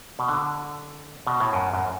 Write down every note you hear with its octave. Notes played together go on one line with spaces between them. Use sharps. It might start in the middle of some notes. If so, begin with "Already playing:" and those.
B2
D3
B2
A2
F#2
F#2